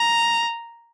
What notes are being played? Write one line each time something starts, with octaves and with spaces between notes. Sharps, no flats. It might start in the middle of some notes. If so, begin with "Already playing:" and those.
Already playing: A#5